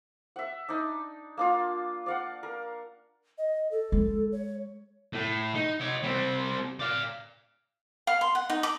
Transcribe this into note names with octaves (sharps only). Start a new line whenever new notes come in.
E5 F#5
D4 D#4
A#3 D4 F4
D5 F5 F#5
A#4
D#5
A4
G#3
C#5
A2
D#4
C#5 D#5
G3 C4
D5 F5
F5
C6
F#5
D#4
D6